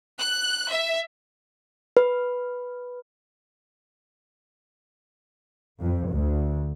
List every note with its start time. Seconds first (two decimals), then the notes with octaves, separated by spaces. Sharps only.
0.20 F#6
0.70 E5
1.97 B4
5.81 F2
6.13 D2